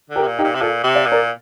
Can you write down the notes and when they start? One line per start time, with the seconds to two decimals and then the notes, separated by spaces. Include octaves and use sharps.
0.10 D3
0.16 G4 A#4
0.23 C3
0.27 A#2
0.38 D#4 G4
0.44 A#2
0.55 C3
0.61 A#2 F4 A4
0.84 C3
0.95 D5 F5
1.06 A#2
1.12 A#4 D5